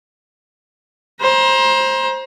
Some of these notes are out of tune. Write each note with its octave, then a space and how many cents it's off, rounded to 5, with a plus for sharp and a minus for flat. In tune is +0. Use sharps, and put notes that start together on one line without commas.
C5 +20 A#5 +35